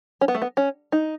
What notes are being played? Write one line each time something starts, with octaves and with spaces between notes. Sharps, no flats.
C#4
B3
A3
B3
C#4
D#4